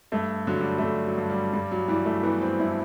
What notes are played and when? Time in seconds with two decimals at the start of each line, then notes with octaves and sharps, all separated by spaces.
0.12 G2 A3
0.47 D3 F#3
0.59 G3
0.70 F#3
0.78 A3
0.83 D3 G3
1.06 F#3
1.18 G2
1.30 G3
1.53 G2 G3
1.72 F#3
1.88 E3 G3
2.06 A3
2.23 E3 B3
2.42 C4
2.59 G2 E4